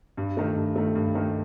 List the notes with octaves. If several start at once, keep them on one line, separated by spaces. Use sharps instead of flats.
G2
D#3 A3
G2
D#3 A3
G2
D#3 A3